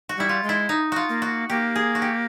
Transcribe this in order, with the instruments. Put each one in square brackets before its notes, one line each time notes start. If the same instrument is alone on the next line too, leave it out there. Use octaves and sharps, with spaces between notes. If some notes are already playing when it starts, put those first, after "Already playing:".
[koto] F#4
[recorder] G3 [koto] E4
[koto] F4
[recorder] G#3
[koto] E4
D#4
F4 F#4
[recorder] A#3
[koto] F#4
[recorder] A#3 [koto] G4
[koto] G#4
F#4
G4